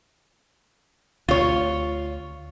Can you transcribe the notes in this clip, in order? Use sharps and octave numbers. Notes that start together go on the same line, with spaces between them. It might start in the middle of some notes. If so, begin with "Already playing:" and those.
D2 F4 C#5